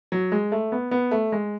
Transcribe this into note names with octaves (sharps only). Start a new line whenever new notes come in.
F#3
G#3
A3
B3
B3
A3
G#3